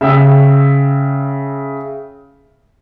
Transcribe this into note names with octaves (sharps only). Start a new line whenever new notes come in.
C#3 E5 G5 E6